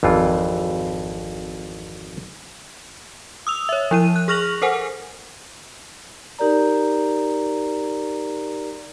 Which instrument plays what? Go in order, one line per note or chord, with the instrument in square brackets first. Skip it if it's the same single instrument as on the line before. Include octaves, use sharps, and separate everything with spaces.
[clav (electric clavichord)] G#1 F2 E3 F4
[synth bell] D#6 E6 F7
C#5 E5
F3 E4 D#7
F#6
G#4 C#6 F6 A#6 F7 F#7
A4 A#4 C5 F#5 G#5
[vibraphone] D#4 G4 A#4 D5 A#5